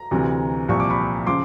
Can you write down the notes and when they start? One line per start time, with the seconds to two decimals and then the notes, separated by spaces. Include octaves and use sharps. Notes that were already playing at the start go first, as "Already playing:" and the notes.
Already playing: A#5
0.11 D2 C3 E3
0.69 C2 A#2 F3 C#6
0.80 D6
0.90 B5 C#6
1.27 C#3 F3 C6 D6